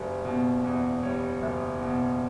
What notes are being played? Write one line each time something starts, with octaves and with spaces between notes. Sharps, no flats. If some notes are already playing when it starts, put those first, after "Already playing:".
Already playing: F#1 G3
B2
E2
G3 C#5
F#1
B2